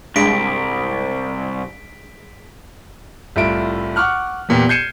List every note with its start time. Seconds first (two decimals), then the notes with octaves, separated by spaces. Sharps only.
0.16 C2 G2 G#3 B6 D7
3.36 C2 A2 F4 E5 D7
3.96 F#5 C#6 D6 F6 F#6
4.49 E2 A#2 B3 G4
4.69 G6 G#6 C7 C#7 D#7 E7